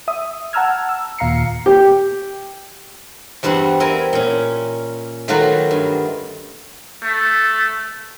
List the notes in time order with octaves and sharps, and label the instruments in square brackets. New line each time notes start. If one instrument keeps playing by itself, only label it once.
[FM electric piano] E5 D#6
F#5 A5 A#5 E6 F6 G#6
E6
D#2 A#2 F5 A#5 C7 C#7
[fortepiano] G4
[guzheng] E2 G2 G3 C4 F#5
C4 E4 A#4 G#5
A#2 C#4
D#3 F#3 A3 F4 F#4 B4
G2
[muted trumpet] A3